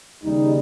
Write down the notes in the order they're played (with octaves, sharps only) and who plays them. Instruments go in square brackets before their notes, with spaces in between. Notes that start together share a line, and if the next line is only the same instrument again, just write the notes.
[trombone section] D#2 C#3 G3 D#4